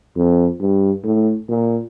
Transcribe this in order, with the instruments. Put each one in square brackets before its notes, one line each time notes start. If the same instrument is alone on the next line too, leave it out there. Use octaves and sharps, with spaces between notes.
[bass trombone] F2
G2
A2
A#2